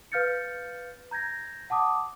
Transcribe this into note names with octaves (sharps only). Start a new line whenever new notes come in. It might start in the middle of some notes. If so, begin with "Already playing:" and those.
B4 F5 F6 G6 A6 C#7
A#5 G6 G#6 A#6
F#5 A5 D6 D#6